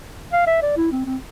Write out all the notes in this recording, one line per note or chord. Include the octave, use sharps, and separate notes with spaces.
F5
E5
D5
E4
C4
C4